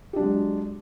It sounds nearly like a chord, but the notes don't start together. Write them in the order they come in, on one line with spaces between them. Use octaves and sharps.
G4 D4 F#3 G#3